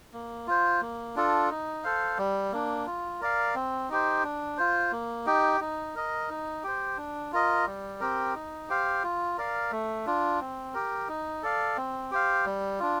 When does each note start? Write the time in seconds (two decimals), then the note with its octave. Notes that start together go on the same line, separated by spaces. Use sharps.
0.13 A#3
0.47 F4 C5
0.81 A#3
1.16 D4 F4 A4
1.50 D#4
1.84 A4 C5 F5
2.18 G3
2.52 A#3 D4
2.87 F4
3.21 A#4 D5 F5
3.55 C4
3.89 D#4 G4 C5
4.24 D4
4.58 F4 C5
4.92 A#3
5.26 D#4 G4
5.61 D#4
5.95 A#4 D#5
6.29 D#4
6.63 G4 C5
6.97 D4
7.32 F4 A#4 D#5
7.66 G3
8.00 C4 G4 A#4
8.35 D#4
8.69 G4 C5 F5
9.03 F4
9.38 A#4 D5 F5
9.71 A3
10.06 D4 F4
10.40 C4
10.74 G4 A#4
11.09 D#4
11.43 A4 D5 F5
11.77 C4
12.11 G4 C5 F5
12.46 G3
12.79 D4 F4